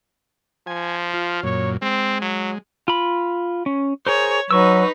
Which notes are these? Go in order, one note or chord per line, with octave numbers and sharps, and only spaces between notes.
F3 G#5
F4
F#2 A#2 C#5
G#3 C4
F#3
F4 B5
C#4
G#4 A#4 C5 C#5
F#3 D#4 B4 C#6 E6